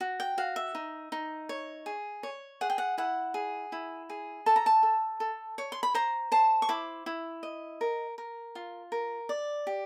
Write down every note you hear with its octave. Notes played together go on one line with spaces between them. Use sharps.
F#4
G5
F#4 F5
E5
D#4
D#4
C#5
G#4
C#5
G#4 F#5
G5
F#5
E4 F#5
G#4
E4
G#4
A4 A5
A#5
A5
A4
A4
C#5
C6
B5
C5 A#5
C5 A5
C#6
E4 D6
E4
D#5
A#4
A#4
F4
A#4
D5
G4